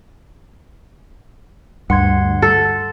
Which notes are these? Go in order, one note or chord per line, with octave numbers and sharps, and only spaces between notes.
D2 G2 F#5 C6 G#6
A4